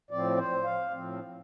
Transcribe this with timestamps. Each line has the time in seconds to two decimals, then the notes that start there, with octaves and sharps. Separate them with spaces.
0.11 A2 F3 C4 D5
0.37 C5
0.64 F5
0.91 A2 F3 C4